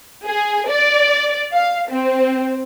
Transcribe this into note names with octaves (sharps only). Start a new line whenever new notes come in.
G#4
D5
F5
C4